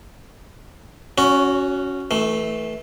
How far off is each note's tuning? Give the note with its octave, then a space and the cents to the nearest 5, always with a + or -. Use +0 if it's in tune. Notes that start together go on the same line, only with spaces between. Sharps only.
C#4 +0 F#4 +0 C#5 +40
E3 -25 A3 +0